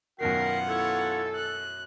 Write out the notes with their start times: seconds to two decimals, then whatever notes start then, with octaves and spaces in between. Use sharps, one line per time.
0.21 F#2 B2 D#3 B3 F4 A#4 F#5 C7
0.68 E4 A4 C#5
1.35 F#6